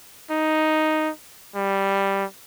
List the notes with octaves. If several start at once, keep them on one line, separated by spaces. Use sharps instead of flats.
D#4
G3